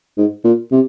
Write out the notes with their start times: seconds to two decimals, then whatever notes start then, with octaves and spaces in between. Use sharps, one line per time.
0.17 G#2
0.44 A#2
0.72 C3